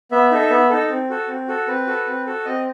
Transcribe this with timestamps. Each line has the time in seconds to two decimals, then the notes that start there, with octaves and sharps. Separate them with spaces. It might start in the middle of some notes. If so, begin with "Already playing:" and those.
0.11 B3 E5
0.31 D#4 A4
0.50 B3
0.70 D#4 A4
0.90 C4
1.10 F#4 A4
1.28 C4
1.48 F#4 A4
1.67 C4 B4
1.87 F#4 A4
2.07 C4
2.26 F#4 A4
2.45 C4 D#5